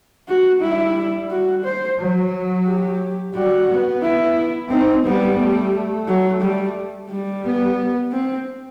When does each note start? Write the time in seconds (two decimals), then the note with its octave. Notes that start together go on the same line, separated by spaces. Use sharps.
0.28 F#4
0.61 G3 E4
1.30 F#4
1.65 C5
1.98 F#3
2.66 G4
3.34 G3 F#4
3.69 B3
4.03 E4
4.71 C4 D#4
5.05 G3 B3
5.40 A3
6.07 F#3
6.41 G3
7.10 G3
7.44 B3
8.12 C4